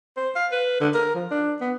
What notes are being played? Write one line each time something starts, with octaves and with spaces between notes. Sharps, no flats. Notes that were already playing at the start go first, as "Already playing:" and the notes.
C5
F5
B4
D3
A#4
F3
D4
B3